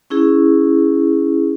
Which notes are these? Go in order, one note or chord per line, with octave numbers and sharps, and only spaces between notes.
C#4 E4 G#4